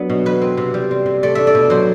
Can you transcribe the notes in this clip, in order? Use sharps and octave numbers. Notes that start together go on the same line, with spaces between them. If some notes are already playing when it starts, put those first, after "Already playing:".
Already playing: F#3 B3 D4
B2
F#3 B4
C4
C3
G3
C4
C3
A3 D5
D4 E5
D5
B2
F#3 C5